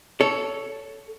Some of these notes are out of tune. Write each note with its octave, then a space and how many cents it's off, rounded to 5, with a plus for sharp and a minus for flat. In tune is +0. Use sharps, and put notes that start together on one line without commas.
A4 +0 C#5 +15